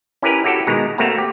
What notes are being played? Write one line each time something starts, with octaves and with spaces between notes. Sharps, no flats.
C#4 E4 G4 A#4 B4
E4 F#4 G4 A4
B2 D#3 G#3 A#5
A3 A#3 C4 F#4 F5 A#5
G4